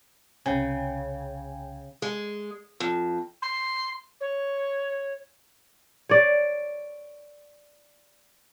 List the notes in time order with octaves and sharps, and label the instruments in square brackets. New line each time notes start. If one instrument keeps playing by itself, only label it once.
[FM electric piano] C2 G5 G#5 [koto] C#3
[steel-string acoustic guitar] G#3
F2
[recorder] C6
C#5
[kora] C#5 D5